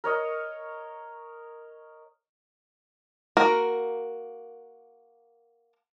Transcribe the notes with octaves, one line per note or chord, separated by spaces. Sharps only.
A#4 C#5 D#5
A#3 F#4 A#4